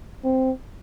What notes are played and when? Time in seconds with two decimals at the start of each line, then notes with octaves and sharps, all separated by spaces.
0.24 C4